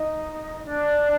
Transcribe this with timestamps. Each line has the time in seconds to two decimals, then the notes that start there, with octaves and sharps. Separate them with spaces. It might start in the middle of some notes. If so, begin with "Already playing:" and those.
Already playing: D#4 D#5
0.64 D4 D5